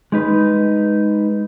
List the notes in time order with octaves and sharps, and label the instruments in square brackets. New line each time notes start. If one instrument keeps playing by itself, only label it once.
[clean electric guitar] G#3 D#4 B4